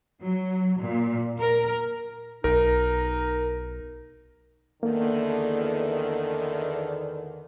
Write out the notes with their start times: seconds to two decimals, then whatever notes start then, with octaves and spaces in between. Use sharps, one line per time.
0.23 F#3
0.81 A#2
1.40 A#4
2.44 B1 D#4 A#4
4.83 E2 D3 D#3 A#3